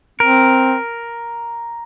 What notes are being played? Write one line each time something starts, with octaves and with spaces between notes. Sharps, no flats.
C4 A#4